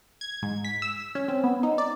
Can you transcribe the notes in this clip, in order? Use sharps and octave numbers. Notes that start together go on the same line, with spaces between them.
G#6
G#2
B6
E6
C#4
C4
B3
D#4
D5